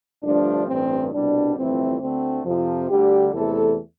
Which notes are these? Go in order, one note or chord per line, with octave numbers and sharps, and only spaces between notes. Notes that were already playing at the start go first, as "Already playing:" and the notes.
G1 G2 F3 A3 D4
A1 G2 E3 C4
C2 B2 G3 D4
G1 F2 E3 A3 C4
D2 D3 A3 C4
F2 C3 F3
D2 D3 G3 G4
E2 C3 E3 A3 A4